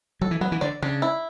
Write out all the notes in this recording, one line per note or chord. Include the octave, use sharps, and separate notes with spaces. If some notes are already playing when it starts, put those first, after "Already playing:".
F#3 A4
E3
F#3 B3
E3
D3 D5
C#3 D4
E4